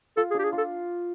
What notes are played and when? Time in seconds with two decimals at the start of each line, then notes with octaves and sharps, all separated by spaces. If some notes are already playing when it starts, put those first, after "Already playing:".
0.17 F4 A4
0.31 G#4
0.34 D4 G4
0.44 G#4
0.53 F4 A4